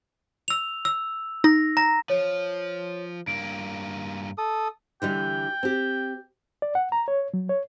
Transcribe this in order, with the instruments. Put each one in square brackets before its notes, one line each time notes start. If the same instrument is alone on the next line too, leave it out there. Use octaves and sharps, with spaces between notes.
[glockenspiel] E6 F7
E6
[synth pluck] D#4 [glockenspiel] A#6
[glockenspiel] A#5 A#6
[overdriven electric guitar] F3 [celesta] C#5
[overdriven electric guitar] G2 A#3 [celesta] D7
[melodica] A4 D#6
[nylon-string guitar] D3 E3 G3 [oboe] G5
[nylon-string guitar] C4 G4
[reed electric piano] D5
F#5
A#5
C#5
F#3
C#5